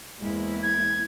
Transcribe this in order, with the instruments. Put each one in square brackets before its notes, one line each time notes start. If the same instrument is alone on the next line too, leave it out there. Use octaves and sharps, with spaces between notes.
[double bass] E2 G#3 [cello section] A#3 C4 E4
[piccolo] G#6